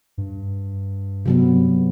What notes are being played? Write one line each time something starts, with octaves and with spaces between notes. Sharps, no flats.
G2
C3 F#3 B3